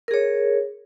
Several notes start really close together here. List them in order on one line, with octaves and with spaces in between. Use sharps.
A#4 G#4 C#5